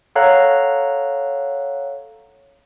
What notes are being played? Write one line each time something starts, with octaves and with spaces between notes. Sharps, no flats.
A4 C#5 F5 F#5 A#5 F#6